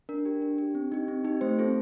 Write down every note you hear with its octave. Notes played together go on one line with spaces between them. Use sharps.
D4 A#4
G4
D4
G4
C4
D#4 G4
C4
D#4 G4
A3 C5
C4 F4 A4